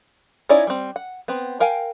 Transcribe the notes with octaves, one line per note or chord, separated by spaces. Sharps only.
C#4 D#4 E4 C#5 D5
G3 C4
F#5
B3 C4
A#4 F5 G5 G#5